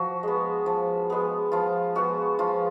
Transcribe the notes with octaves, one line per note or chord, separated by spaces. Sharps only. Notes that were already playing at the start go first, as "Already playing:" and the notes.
Already playing: F3 F#4
G#3 B3
F3
G#3 B3
F3 F4
G#3 B3 F#4
F3 F4